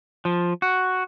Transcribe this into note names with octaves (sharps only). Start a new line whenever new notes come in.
F3
F#4